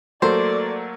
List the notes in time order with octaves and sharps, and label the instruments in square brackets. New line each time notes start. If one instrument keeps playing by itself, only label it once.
[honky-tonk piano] F#3 A3 A#3 [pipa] C5 [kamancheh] D5